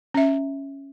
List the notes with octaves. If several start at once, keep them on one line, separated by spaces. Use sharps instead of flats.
C#4 E5